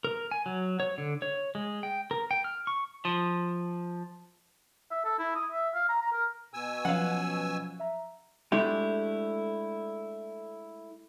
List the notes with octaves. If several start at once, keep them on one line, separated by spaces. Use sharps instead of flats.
A#4
G#5
F#3
C#5
D3
C#5
G#3
G5
A#4
G5
F6
C#6
F3
E5
A4
E4
D#6
E5
F5
A#5
A#5
A#4
B2 G#5 E6
F3 F#3 C#4 F5 F#5
E5 A#5
G#3 A3 D4 E4 G4